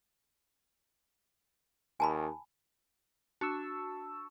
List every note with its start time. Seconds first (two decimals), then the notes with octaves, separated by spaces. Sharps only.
2.00 D#2 G#5 A5 B5
3.41 D4 F#4 A5 C#6 E6